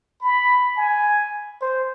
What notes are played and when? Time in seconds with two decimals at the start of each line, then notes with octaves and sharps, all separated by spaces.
0.21 B5
0.77 G#5
1.62 C5